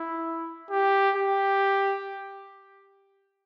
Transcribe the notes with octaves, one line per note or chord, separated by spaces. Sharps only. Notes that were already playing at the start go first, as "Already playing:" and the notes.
Already playing: E4
G4
G4